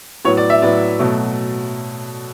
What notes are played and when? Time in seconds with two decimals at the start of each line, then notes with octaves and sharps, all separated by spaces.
0.25 A2 F#3 B3 C#5
0.37 D5
0.50 E5
0.62 A2 F#3 B3 D5
0.99 B2 F#3 A3